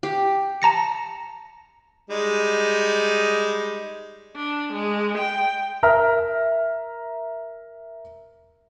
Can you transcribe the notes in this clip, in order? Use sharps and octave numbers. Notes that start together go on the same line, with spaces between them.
G4
A5 A#5 A#6 C#7
G3 G#3 D#4
D4
G#3
G5
A#4 E5 A#5 F6